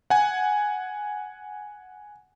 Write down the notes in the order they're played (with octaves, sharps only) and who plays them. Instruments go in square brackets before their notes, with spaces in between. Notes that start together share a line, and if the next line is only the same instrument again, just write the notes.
[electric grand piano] F#5 G#5